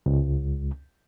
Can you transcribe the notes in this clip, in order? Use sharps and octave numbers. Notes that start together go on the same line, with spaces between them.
C#2